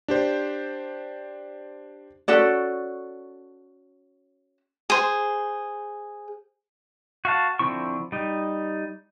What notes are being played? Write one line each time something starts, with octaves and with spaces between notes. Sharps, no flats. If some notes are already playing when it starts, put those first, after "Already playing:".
D4 G4 C5
C#4 F#4 A4 D5
G#4 C5
F#4 F5 A5
D3 F3 C4 E4 C#6
G3 D#4